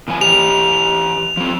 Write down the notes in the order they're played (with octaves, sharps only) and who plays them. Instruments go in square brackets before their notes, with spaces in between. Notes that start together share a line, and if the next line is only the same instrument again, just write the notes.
[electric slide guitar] A#2 F3 G#5
[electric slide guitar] E3 G4 [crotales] F7
[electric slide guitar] F3 C4